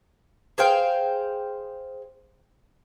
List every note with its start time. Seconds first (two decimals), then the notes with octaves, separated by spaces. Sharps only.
0.58 G#4 C5 F5 G5